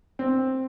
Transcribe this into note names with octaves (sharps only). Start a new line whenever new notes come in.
C4